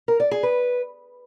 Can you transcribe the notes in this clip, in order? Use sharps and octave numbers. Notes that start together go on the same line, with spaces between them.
A#4
D5
G#4
B4